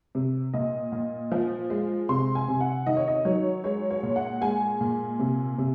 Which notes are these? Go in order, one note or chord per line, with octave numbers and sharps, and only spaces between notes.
C3
A#2 D#5
A#2
F3
G#3
C3 C6
G#5
C3
F#5
D#3 D#5
C#5
D#5
F#3 C#5
G#3 C#5
C#5
A#2
F#5
G#3 G#5
A#2
C3
C3